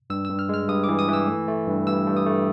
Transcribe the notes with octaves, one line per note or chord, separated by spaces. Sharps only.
G2 E6
G2 E6
F6
G#3 F6
G2 D#6
E3 D6
D#6
E3 E6
A3
A3
G2
G2 E6
G2
D#6
A3